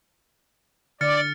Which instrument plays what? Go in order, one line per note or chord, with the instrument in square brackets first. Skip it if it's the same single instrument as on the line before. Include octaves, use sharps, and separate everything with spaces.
[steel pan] D3 [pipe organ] D5 [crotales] F6 A6 C#7